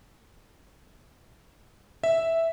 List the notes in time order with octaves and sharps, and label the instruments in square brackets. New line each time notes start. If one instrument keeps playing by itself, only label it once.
[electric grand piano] E5